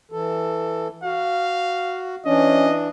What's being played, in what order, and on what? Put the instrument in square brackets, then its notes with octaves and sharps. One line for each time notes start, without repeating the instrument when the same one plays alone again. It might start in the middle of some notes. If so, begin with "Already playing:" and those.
[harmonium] E3 A4
[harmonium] F#4 [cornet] F5
[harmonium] E3 D4 [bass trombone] C#4 [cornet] D#5